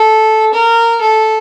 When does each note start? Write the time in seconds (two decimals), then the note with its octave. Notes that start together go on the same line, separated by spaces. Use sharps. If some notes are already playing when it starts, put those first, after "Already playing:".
Already playing: A4
0.54 A#4
1.01 A4